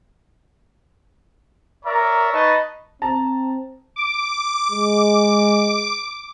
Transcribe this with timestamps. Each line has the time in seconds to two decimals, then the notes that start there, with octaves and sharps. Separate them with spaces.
1.85 A#4 C#5 D5 E5 A#5
2.32 D#4 B4 D#5 A5 B5 C#6
3.02 C4 A5 A#5
3.96 D6
4.72 G#3